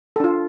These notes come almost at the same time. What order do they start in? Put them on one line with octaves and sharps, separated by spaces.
A4 D4 F4